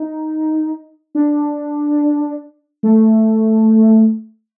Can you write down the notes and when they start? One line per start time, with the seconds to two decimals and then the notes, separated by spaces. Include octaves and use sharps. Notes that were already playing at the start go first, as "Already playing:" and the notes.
Already playing: D#4
1.15 D4
2.83 A3